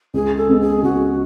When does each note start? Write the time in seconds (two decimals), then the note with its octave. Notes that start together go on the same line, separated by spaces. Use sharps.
0.14 C#2 G#4
0.37 A4
0.49 C#3 G#3 B3
0.61 G#4
0.83 C#2 F#4